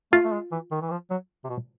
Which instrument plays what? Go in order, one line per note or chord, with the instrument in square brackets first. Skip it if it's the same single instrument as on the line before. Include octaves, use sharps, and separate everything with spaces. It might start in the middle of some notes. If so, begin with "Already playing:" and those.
[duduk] A3 [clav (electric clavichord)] F4
[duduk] A3
G#3
E3
D#3
E3
F3
F#3
C3
B2